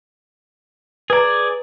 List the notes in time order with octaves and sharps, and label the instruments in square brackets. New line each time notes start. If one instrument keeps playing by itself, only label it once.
[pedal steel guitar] G#4 D5 [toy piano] B4 A#5